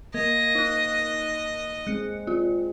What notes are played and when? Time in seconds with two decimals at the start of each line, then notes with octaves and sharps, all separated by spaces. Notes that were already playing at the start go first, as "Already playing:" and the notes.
0.14 A#3 D#5 G#6
0.55 D#4 F#6
1.87 G#3 C4 F#6 C#7
2.27 C4 F4